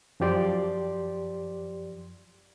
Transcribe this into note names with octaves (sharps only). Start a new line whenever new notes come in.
F#2 F3 G4 D5 C6